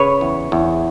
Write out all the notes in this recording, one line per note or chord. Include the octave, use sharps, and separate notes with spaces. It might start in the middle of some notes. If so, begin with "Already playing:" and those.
Already playing: C#3 B4 C#5
E2
E2